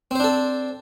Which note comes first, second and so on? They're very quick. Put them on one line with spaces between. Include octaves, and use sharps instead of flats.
C4 C5 D4 A4